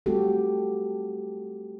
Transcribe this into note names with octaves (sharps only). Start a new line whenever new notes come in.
G3 A3 C4 F#4 G4 A4